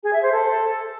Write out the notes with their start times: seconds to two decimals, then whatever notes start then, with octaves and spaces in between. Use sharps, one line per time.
0.04 G#4
0.13 E5
0.23 C5
0.32 A4